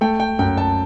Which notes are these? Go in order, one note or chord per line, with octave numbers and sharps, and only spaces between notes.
A3 G5
G5
F#2 G5
A5